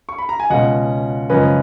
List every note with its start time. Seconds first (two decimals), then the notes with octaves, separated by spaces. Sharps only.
0.09 C#6
0.18 B5
0.29 A#5
0.40 G#5
0.50 C#2 B2 G#3 C#4 D#5 F#5
1.30 F#2 C#3 F3 G#3 C#4 B4 D#5